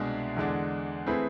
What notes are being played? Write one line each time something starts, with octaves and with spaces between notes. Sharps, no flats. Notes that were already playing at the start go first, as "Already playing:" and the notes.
Already playing: C2 B2 G#3 D4 G#4
E2 D3 G#3 D4
E3 A3 C4 G#4 B4